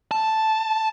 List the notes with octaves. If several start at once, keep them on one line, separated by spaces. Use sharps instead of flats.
A5